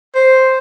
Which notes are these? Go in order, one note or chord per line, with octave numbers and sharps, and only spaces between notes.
C5